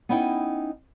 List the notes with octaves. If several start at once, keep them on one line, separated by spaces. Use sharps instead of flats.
B3 C#4 D#4 E4 D#5 G5